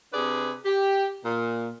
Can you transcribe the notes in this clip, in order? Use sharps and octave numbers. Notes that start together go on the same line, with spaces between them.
C3 D4 G#4 B4 D5
G4
A#2